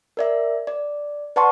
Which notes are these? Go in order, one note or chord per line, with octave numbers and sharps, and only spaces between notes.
A#4 D5 E5
D5
B4 D5 F#5 A5 C6 C#6